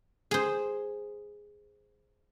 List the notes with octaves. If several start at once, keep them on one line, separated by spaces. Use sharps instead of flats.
G#4 C5